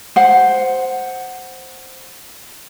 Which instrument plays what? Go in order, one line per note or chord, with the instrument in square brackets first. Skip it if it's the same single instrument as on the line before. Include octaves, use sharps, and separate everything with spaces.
[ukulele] C5 F#5